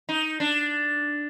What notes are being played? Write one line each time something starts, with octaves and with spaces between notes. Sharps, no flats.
D#4
D4